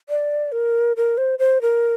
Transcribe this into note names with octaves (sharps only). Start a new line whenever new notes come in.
D5
A#4
A#4
C5
C5
A#4